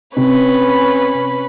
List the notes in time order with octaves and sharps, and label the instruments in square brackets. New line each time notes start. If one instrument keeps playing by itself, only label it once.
[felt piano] C3 [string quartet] C#4 B4 B5